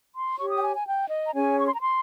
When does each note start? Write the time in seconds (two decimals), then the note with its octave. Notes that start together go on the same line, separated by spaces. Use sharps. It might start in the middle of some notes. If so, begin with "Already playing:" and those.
0.14 C6
0.38 G4 C#5 C#6
0.50 D#6
0.57 G5
0.62 G#5
0.75 G#5
0.87 G5
1.10 D#5
1.27 A#5
1.34 C#4 G#4 C#5 G#5
1.58 C#6
1.66 C6
1.74 A#5
1.82 C6